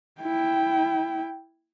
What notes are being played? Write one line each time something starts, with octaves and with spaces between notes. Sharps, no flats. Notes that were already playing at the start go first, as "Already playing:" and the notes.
E4 G5